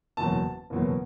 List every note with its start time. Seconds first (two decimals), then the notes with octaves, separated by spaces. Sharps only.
0.17 F#1 E2 B2 F#3 A5
0.70 F#1 E2 B2 F#3